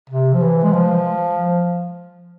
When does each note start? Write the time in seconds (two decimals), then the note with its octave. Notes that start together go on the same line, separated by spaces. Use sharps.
0.10 C3
0.33 F3
0.42 E3
0.63 G#3
0.73 F3